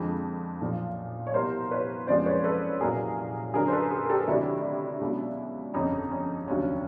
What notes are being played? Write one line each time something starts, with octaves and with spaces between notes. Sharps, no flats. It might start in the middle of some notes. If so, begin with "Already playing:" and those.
Already playing: F2 D3 F3 G#3
B1 A#2 F3
C#5
C2 B2 G3 A#4 C5
B4 C#5
F#1 F2 C#3 F3 G#3 C5 D5
B4 C#5
A4 B4
C2 A#2 F#3 G#4 A#4
F#2 D3 F#3 G#4 A#4
C5
A4 B4
G#4 A#4
A#4
G4 A4
D2 C3 D#3 F#3 D4 E4
C#2 B2 F#3
G1 F2 C#3 C#4 D#4
C#4
F1 D#2 D3 F#3 C#4